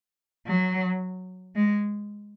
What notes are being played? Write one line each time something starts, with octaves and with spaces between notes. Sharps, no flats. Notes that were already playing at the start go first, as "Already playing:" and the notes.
F#3
G#3